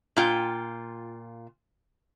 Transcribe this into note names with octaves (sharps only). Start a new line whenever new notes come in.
A#2 F4 G5